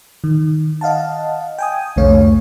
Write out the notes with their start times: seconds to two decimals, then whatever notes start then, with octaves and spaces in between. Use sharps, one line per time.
0.24 D#3
0.81 D#5 F5 F#5 A5
1.59 G5 G#5 D#6
1.96 C2 F2 D3 A3 C#5 F5